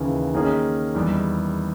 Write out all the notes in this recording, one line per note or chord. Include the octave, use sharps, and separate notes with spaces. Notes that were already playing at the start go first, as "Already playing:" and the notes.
Already playing: D#2 C#3 E3
D#3 A#3 C#4 G#4
E2 D#3 G3